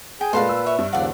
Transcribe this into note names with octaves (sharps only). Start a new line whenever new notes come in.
G#4 G5 G#5
A#2 G#3 A3 B4 F5 A5 C6
E6
C#5 E5
G2
D#2 C#3 F3 D5 F5 F#5